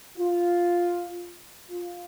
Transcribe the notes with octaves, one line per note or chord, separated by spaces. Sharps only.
F4
F4